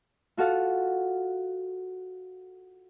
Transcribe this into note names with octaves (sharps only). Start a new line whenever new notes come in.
F4 F#4 A4 F5